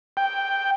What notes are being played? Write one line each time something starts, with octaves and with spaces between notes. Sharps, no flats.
G5